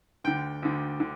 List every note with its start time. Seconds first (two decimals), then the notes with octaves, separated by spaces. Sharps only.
0.24 D2 D3 G5
0.62 D2 D3
1.00 D3